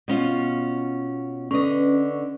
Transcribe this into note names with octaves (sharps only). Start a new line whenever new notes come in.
B2 C#4 F4
D3 C#4 B4 D#5